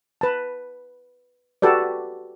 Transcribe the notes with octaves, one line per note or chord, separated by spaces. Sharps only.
B4 A5
F#4 G4 A4 B4 D5